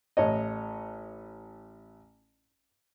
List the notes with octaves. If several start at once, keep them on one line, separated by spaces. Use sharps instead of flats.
A1 C#5 D#5